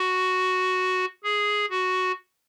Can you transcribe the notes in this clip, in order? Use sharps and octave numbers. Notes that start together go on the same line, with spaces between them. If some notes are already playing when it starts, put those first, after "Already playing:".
Already playing: F#4
G#4
F#4